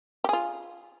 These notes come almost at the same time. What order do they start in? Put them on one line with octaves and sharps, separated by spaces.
G4 G#4 F4